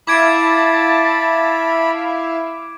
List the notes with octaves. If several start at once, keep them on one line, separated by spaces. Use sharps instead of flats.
E4 E5 F5 A5 B5 D6 G#6 D7